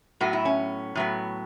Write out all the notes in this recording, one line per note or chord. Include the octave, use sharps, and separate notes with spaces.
A2 F#3 B3 F#4
E4
C#4
A2 F#3 B3